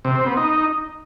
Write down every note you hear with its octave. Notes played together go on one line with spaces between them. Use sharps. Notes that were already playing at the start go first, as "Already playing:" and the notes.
C3
C4
B3
D#4